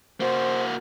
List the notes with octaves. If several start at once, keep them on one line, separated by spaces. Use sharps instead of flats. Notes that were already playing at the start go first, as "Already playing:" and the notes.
A#3 F#4 C5